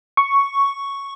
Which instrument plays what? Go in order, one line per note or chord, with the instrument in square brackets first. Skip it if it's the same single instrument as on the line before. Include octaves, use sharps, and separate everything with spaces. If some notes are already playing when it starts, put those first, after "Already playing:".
[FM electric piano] C#6